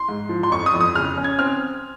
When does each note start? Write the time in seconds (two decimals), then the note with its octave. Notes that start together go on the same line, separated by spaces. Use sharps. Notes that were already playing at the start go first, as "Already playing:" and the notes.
Already playing: C6
0.09 G#2
0.29 F3
0.43 C6
0.52 F2 C#6
0.66 D#6
0.74 F2
0.81 D#6
0.95 C#3 F6
1.17 C#4
1.24 G#6
1.39 C4 F6